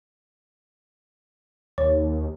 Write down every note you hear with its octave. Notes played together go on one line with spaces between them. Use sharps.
D#2 C#5